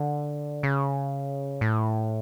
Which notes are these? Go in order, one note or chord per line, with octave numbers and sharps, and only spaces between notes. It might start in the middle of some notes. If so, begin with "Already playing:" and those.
Already playing: D3
C#3
A2